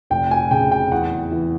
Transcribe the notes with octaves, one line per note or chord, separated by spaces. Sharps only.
F1 G5
G#5
C#3 G5
G5
E2 F#5
E3